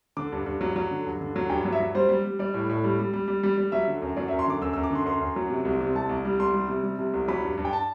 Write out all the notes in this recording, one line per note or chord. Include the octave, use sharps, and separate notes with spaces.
D3 D6
G2
G2
F#3
F#3
D3
G2
D3
F#3
G2 G5
F#3
E5
F#3
G3 C5
G3
G3
G3 D5
A2
A2
G3
G3
G3
G3
G3
G3
F#3 E5
D3
F#2
F#3 D5
E5
F#2
C6
D3 D6
F#2 E6
E6
F#2
D6
D3 C6
F#2 C6
F#2
F#3
C3
C2
C3
C2 A5
C2
G3
C2 C6
G3
C3
G3
C3
C2
F#3 B5
G2
G2
G5
A5